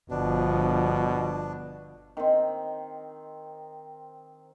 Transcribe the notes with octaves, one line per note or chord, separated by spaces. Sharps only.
G1 B2 F3 D4
D#3 C4